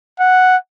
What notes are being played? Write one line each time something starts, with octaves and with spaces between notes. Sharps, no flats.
F#5